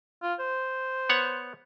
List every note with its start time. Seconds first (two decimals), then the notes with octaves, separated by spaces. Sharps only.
0.23 F4
0.39 C5
1.09 B3 C#5 F#5